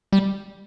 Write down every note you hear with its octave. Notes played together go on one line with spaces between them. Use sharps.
G3